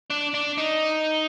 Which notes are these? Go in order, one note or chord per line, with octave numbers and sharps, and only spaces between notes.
D4
D4
D#4